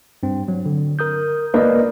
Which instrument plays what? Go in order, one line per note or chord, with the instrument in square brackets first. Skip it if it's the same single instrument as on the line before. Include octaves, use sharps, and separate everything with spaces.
[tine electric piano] G2 C4
F#3
D3
A#4 D#6 G6
[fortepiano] A#3 [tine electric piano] B4 D5 D#5